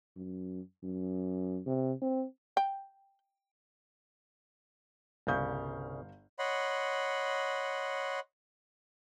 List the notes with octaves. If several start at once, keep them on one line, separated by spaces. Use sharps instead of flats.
F#2
F#2
C3
C4
G5
G1 C2 C#3 F5 G6
C#5 D#5 F#5 B5 C6